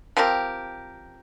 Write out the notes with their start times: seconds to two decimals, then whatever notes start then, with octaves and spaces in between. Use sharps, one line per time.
0.17 F3 C4 G4 A#4